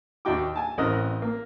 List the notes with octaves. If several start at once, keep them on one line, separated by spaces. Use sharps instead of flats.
D#2 D4 D#4 F#4 G5 D6
G#5 A5
A1 C4 A#4 D#5 F#6
A#3